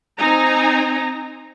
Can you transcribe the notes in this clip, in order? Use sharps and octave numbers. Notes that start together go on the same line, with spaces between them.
C4 D#4 G#5 A#5